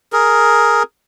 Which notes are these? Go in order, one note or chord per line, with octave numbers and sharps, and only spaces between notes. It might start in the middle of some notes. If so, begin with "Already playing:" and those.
G#4 A#4